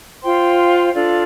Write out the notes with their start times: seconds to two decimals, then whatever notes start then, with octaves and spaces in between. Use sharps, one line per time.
0.22 F4 C5 G5 C6
0.94 D4 F4 A4 D5